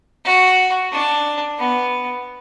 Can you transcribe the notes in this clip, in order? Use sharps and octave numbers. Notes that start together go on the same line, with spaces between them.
F#4
D4
B3